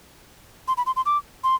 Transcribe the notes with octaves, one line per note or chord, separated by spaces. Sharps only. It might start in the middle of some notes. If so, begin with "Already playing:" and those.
C6
B5
C6
C6
D6
C6